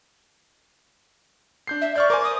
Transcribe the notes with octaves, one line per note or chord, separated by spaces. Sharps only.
D4 G6 C7
E5
D5 C#6 F6 G6
A#4 C5 G#5 D6
D#6